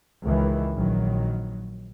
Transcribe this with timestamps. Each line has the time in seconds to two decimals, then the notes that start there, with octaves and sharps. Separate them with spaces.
0.23 C#2 D#3 E3
0.74 A#1 D#3 F#3